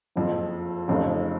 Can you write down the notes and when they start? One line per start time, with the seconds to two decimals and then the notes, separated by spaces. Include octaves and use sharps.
0.16 F#1 F2 F3
0.88 F1 F2 C#3